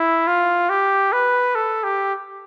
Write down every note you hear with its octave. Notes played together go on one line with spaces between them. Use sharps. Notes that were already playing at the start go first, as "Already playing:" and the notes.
Already playing: E4
F4
G4
B4
A4
G4